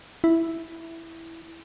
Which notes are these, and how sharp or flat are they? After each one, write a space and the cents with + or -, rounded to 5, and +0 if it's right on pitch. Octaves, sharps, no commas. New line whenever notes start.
E4 +0